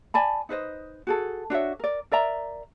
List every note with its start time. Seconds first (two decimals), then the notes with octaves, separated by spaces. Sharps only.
0.14 D5 G#5 A5 B5
0.49 D#4 B4 C5 D#5
1.07 F#4 G#4 A4
1.50 D4 F#4 C#5 E5
1.79 A#4 D5
2.12 A#4 D5 E5 A#5